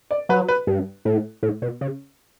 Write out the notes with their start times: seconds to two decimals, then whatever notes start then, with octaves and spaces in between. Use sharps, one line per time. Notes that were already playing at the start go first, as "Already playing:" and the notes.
0.11 D5
0.29 F#3 B4
0.48 B4
0.67 G2
1.05 A2
1.43 A2
1.62 B2
1.81 C#3